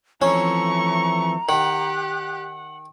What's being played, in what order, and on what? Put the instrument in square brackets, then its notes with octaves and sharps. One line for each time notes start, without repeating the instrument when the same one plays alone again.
[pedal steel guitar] E3 F3 C4 [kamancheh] A3 C#6 [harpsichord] C#4 [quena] A#5
[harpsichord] D#3 [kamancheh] G4 F#6 [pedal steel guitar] F#5